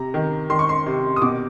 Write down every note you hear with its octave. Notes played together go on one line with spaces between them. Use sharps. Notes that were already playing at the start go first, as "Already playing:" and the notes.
Already playing: C3 A#5
D#3
D#3 C6
C#6
C6
C3
D#6
B2 D6